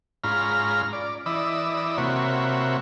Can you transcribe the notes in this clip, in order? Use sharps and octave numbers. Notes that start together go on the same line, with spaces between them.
G#2 C#4 F4 A#5 B5 F6
D5
E3 D5 D#5 B5 E6
C3 A#3 F#4 C#5 E5 B5